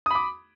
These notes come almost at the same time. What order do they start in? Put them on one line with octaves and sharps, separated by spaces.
D#6 B5 D6